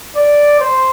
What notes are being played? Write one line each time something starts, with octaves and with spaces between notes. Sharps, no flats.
D5
C5